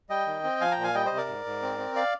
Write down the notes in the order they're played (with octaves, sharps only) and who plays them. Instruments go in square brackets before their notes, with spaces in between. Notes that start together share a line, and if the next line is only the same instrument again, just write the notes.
[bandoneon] G3 D#5 G5
D#3
C4
F3 F5 G#5
G5 A#5
A#2
F5 G#5
G3 D#5 G5
C5 D#5
C3
A#4 D5
G#2
G#2
C4
C4
D5 F5